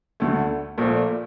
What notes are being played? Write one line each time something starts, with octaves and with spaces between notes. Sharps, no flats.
D2 D3 A3
A#1 A#2 A3